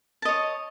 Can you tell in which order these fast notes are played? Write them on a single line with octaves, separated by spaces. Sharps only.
A5 D#5 C#5